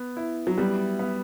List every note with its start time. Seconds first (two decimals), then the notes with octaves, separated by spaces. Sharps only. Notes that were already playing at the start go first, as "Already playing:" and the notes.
Already playing: B3
0.17 E4
0.47 F#3
0.58 G3 B3
0.99 B3